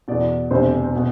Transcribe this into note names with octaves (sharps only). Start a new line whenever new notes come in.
E2 B2 D5
E1 D2 C3 C5
B2